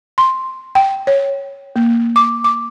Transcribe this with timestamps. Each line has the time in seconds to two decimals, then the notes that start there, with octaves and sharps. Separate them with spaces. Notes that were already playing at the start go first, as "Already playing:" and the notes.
0.18 C6
0.75 G5
1.07 C#5
1.76 A#3
2.16 D6
2.44 D6